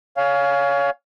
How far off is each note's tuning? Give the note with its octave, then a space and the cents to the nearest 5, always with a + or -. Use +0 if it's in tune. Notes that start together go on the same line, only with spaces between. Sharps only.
C#5 +25 F5 +10 G#5 +0